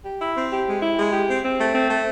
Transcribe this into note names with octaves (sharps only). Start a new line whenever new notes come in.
G4
E4
C4
G4
G#3
E4
G#3
G4
C4
C4
A3
C4
A3